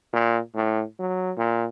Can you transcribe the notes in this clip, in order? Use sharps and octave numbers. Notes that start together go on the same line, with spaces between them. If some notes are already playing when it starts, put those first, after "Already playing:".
A#2
A2
F#3
A#2